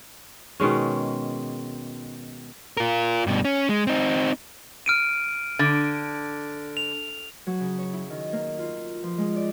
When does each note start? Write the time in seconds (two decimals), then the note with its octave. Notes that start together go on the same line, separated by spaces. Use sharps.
0.60 B2 D#3 G#3 C#4
2.77 F4 A#4
3.27 G2 B2
3.45 C#4
3.69 G#3
3.87 C4 D#4
4.86 F6 D7 D#7
5.59 D3
6.77 F7
7.47 F#3
7.60 C#3
7.79 C#5
7.93 E4
8.10 D#3
8.33 A#3
8.59 F4
9.03 F3
9.18 G#3
9.36 D5